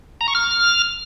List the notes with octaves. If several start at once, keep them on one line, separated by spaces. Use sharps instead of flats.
A#5
C#6
F6